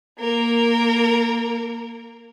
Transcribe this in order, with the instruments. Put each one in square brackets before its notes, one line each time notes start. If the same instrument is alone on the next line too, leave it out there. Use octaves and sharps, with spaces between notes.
[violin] A#3 A#4